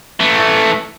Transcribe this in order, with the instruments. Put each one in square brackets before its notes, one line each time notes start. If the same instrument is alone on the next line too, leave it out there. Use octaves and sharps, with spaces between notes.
[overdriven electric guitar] E3 A3